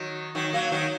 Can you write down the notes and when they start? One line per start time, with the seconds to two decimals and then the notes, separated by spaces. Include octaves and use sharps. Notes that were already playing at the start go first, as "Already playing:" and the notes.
Already playing: D#3 F#3
0.35 D#3 F#3
0.53 F#3 A#3
0.72 D#3 F#3